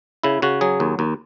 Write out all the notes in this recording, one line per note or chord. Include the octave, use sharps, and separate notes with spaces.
C#3 E4
C#3 F#4
F#3 G#4
D#2
D#2